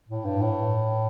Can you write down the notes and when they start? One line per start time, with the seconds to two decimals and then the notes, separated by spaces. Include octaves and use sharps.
0.09 A2
0.25 G2
0.41 A2